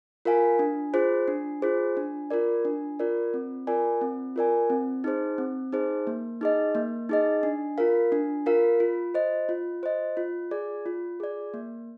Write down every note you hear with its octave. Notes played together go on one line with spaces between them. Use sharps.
F4 A#4 F5 G#5
D4
F4 G#4 C5
D4
F4 G#4 C5
D4
F4 A#4 D5
D4
F4 A#4 D5
C4
F4 A#4 D5 G#5
C4
F4 A#4 D5 G#5
C4
D#4 G#4 C5
C4
D#4 G#4 C5
A#3
D#4 G#4 D#5
A#3
D#4 G#4 D#5
D4
F4 A#4 F5
D4
F4 A#4 F5
F4
C5 D#5
F4
C5 D#5
F4
G#4 D5
F4
G#4 D5
A#3